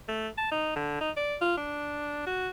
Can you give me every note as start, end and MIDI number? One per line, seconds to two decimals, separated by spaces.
0.09 0.28 57
0.38 0.48 81
0.52 0.74 63
0.76 0.98 50
1.01 1.10 63
1.16 1.36 74
1.41 1.55 65
1.57 2.22 62
2.26 2.50 66